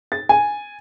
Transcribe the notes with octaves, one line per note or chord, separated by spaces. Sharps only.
A6
G#5